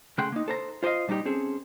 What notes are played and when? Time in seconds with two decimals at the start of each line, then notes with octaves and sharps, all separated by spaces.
0.18 C#3 A3 F#5 G5 C6
0.32 A#3 D#4
0.48 A4 C5 A#5
0.83 F4 C5 D5 D#5 F5
1.08 A#2 G3 D4 D#4 G4
1.25 C4 C#4 G#4 A4